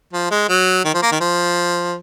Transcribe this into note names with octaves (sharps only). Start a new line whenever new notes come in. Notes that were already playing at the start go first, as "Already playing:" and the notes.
F3
G#3
F#3
D#3
F3
A#3
D#3
F3